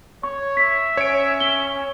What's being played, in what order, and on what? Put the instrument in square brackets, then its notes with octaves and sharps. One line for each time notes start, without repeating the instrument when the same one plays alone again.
[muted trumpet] C#5 [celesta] C#6
[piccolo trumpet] E5 [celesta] B6
[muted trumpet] C#4 [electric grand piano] C#5 D7
[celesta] G7